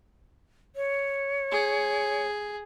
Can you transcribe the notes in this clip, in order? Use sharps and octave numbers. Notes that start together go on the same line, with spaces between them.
C#5
G#4